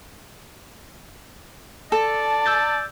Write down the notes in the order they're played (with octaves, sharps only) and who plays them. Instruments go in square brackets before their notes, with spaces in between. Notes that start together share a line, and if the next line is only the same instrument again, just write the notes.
[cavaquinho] A4 [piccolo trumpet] D5 [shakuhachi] A5
[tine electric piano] E6 G6 A6